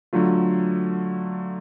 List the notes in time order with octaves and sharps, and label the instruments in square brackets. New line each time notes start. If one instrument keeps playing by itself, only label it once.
[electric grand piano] D3 F#3 A3 F4